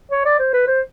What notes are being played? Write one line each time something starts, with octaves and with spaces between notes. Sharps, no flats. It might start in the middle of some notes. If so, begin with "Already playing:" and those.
C#5
D5
C5
B4
C5